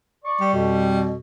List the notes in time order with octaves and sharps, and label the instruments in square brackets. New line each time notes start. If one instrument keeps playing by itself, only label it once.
[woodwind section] D5 C#6
[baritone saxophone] G3
[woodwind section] F2 B2